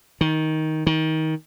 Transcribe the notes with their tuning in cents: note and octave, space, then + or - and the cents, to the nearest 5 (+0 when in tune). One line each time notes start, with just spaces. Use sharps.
D#3 +10
D#3 +25